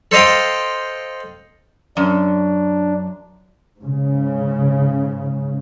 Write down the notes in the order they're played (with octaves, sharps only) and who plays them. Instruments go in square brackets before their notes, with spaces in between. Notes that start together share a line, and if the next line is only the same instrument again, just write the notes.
[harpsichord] A4 C5 D#5 F5 G5
[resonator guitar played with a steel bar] F#2 [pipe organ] D4
[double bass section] G#2 C#3